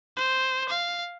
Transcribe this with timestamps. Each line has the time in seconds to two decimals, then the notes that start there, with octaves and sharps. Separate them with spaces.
0.16 C5
0.69 F5